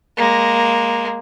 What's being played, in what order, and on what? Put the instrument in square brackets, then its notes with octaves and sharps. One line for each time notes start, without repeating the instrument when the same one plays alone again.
[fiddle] G#3 A#3